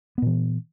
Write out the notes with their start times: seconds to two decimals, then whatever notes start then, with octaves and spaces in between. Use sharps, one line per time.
0.18 B3
0.22 A#2
0.26 E3